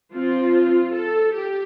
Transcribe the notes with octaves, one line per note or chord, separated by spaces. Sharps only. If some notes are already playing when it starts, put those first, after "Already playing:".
F3 C4 F4
A4
G4